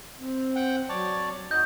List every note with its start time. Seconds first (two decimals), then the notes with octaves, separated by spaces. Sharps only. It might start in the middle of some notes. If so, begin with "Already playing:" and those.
0.20 C4
0.56 F#5 G5
0.89 F#3 C#5 D5 A5
1.51 D#2 D#4 F#4 D#5 G6